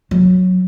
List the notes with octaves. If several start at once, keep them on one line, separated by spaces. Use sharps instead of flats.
F#3